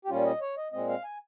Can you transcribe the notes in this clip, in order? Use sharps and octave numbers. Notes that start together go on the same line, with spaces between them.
G4
A#2 G3 C#4 F4
D#5
C#5
D#5
A#2 G#3 C4 D#5
F5
G#5